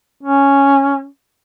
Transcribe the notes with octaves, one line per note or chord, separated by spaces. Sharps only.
C#4